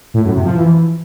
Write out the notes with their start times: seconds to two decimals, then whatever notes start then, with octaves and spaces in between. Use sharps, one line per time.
0.14 A2
0.24 F#2
0.34 C3
0.45 F3
0.55 E3